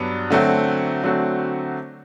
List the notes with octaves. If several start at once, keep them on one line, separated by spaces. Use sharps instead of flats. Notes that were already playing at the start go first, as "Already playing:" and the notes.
Already playing: G2 F#3 B3 D4
D3 F#3 A3 C4 F#4
D3 F#3 A3 C4 F#4